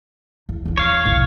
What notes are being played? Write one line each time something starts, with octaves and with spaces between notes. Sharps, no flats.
E2
E2 F3
C#5 F5
B1 E2